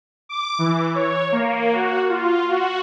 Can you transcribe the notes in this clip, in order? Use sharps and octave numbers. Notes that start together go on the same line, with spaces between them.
D6
E3
C#5
A#3
F#4
F4
F#4